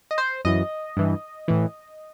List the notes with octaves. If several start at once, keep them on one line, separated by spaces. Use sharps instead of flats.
D#5
C5
F#2 E3 D#5
G2 E3
A2 E3